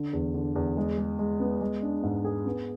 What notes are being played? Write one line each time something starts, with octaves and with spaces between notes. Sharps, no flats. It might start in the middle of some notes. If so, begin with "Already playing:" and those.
Already playing: D3
E2
D3
E2
G#3
G#3
G#3
B3
G#3
D4
G#2
G#4
B3